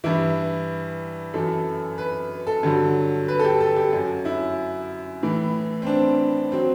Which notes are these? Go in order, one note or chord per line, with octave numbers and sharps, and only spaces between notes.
G2 E3 E4
F#2 E3 A4
B4
A4
G2 D3 F#3
B4
A4
G4
A4
G4
F#2 F#3
E4
A2 E3
C4
D4
F#3 C4